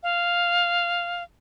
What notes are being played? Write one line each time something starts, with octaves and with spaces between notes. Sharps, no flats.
F5